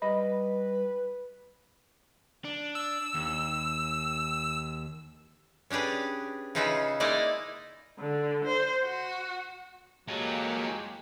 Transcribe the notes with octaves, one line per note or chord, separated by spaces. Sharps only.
G3 B4 D#5 B5
D4
E6
D#2
C#4 D4 G4 G#4 B4
C#3 C#4 D#4 F4 B4 E5
G#3 A#3 D#4 E4 D5 D#5
D3
C5
F#4
F#3 G#3 A#3 F4 G4 A4